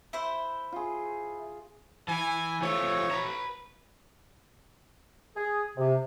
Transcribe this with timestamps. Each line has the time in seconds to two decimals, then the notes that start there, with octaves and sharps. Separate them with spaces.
0.13 E4 C5
0.72 F4 G#4
2.08 E3 G#5
2.62 F3 A3 C#5
3.11 B4 A#5
5.36 G#4
5.77 C3